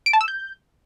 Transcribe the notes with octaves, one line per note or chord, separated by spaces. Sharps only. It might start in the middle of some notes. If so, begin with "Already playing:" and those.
D7
A5
E6
G6